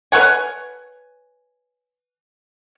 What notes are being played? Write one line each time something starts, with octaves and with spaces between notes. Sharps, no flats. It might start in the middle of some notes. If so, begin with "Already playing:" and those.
B4 C#5 F#5 G#5